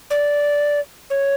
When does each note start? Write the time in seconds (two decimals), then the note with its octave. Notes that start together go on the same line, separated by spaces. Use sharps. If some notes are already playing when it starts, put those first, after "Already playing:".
0.11 D5
1.10 C#5